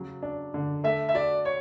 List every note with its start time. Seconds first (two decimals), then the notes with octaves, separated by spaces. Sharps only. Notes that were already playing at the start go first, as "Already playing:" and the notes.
Already playing: C#3 F#3 C#4
0.23 D4
0.54 D3
0.84 A3 E5
1.09 E5
1.15 F#4 D5
1.45 C#5